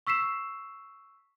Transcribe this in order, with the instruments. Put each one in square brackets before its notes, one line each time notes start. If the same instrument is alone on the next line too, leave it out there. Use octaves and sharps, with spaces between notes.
[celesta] C#6 E6 B6 C7 E7